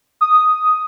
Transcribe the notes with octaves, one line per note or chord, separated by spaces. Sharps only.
D#6